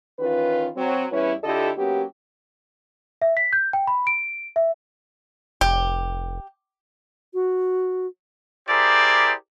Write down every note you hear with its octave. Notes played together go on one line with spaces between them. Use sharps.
D#3 E3 C#4 F4 B4
F#3 C4
E2 G3 C#4 E4 B4 C#5
D3 E4 F4 G4 A4 D#5
F#3 A#3 B3 C#4 G4
E5
B6
G6
G5
B5
D7
E5
F1 G4
F#4
E4 G4 G#4 A#4 C5 D5